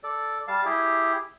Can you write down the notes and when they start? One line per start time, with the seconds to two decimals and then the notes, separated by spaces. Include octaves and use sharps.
0.03 A4 D5
0.48 G3 F5 A5
0.65 E4 G4 G#4